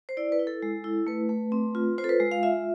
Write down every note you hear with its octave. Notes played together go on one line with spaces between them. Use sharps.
C5
E4 D5
B4
E4
A4
G#3
E4
A3 B4
A3
C4
F4
F4 C5
A4
B4
G#3
F5
F4 E5